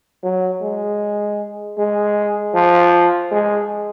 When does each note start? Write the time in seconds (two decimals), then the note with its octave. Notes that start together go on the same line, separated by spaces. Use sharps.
0.23 F#3
0.62 G#3
1.78 G#3
2.55 F3
3.32 G#3